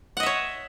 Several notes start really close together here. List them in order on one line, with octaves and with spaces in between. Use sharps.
F#5 D#5 E5 C#5